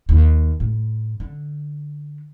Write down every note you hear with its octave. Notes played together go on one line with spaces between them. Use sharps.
D#2
A2
D3